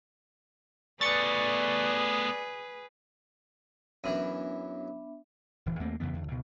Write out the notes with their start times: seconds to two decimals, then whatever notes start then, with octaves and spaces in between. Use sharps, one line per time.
1.01 A3 B3 G#4 B4 D5 A6 C#7
4.04 F#2 E3 F#3 B3 D4 E5
5.66 D1 E3
5.79 D#2 A3 A#3 C4
6.00 F2 C#3 E3 B3
6.13 E2 D3
6.28 C#2 B2